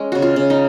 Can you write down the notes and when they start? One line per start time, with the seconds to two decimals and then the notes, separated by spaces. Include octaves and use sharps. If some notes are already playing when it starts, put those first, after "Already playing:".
Already playing: G#3 C#4
0.12 C#3 F#4
0.22 F4
0.36 C#3
0.50 D#4